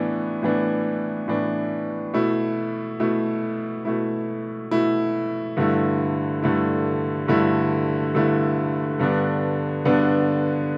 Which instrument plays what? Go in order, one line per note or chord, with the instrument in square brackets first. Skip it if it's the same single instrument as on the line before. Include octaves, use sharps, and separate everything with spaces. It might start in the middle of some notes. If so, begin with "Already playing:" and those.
Already playing: [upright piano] A2 E3 B3 D4
A2 E3 B3 D4
A2 E3 B3 D4
B2 A3 E4
B2 A3 E4
B2 A3 E4
B2 A3 E4
G2 D3 A3 E4
G2 D3 A3 E4
G2 D3 A3 E4
G2 D3 A3 E4
G2 D3 B3 D4
G2 D3 B3 D4